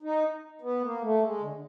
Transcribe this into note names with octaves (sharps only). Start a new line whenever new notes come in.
D#4
B3
A#3
A3
G#3
D3
D3